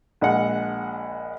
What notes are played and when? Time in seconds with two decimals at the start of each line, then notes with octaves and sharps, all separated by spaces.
0.21 A#1 G#3 F#5